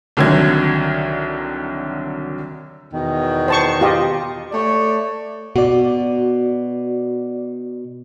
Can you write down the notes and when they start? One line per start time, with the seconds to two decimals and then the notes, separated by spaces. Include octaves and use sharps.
0.17 C2 D3 D#3 F#3 G#6
2.92 E2 B2 D#3
3.48 C5 A5 C#6
3.81 F4 G4 D#5
4.52 A3 C#5 D5
5.56 B2 F#4 D5